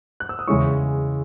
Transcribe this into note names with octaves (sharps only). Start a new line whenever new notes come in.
F#6
E6
D#6
E2 C#3 G#3 C#4 E4 C#6